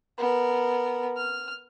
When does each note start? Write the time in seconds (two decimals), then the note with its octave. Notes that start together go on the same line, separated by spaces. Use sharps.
0.18 B3 A#4
1.17 F6